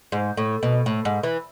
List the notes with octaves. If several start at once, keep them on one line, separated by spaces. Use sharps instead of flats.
G#2
A2
B2
A2
G#2
E3